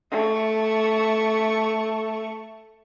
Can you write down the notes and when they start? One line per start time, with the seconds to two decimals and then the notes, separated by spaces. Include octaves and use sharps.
0.11 A3 C#6